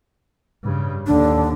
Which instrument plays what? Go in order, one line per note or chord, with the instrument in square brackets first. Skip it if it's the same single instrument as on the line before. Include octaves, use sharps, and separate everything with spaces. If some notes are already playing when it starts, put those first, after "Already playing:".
[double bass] G2 C#3
[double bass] D#2 D3 [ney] D4